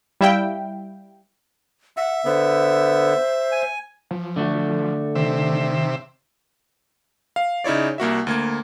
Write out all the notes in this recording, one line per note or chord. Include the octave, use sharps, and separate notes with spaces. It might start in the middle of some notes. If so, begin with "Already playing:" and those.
G3 E4 E5 F5 G5
E5 F#5
D3 B3 C5
G#5
F3
D3 A3 F#4
C3 D#3 E5
F5
C#3 D#4 E4 C#5 D5
C2 A#3 F#4 E5
D2 A#3 G#6